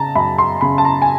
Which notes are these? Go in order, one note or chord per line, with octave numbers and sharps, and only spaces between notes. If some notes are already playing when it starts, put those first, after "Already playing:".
Already playing: C#3 A5 A#5
F#2 B5
C6
C#3 B5
A5
A#5
G#5